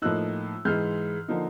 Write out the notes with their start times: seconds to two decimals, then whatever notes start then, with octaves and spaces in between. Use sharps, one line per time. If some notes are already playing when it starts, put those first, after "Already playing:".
0.02 A2 F3 A#3 D#4 E6 F#6
0.65 G#2 E3 G#3 F6 G6
1.28 D3 F3 A#3 D#4